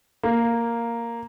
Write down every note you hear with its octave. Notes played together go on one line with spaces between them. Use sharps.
A#3